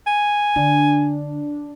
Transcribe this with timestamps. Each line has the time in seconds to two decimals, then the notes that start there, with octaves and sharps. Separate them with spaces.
0.06 G#5
0.56 D3 D4